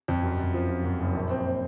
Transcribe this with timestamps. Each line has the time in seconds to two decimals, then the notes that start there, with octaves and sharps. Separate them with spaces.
0.08 F2
0.23 F#2
0.39 F#2
0.54 F3
0.69 F3
0.84 F#2
1.00 F#1
1.14 A#1
1.30 C4
1.46 C4